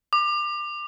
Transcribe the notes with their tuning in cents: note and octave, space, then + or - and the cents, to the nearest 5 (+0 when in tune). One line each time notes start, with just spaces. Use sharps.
D6 +30